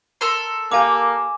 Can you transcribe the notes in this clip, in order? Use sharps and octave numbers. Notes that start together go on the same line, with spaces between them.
A4 A#4 C6
A#3 G4 F5 G#5 A#5 D6